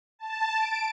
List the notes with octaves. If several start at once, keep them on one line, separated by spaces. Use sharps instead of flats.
A5
D7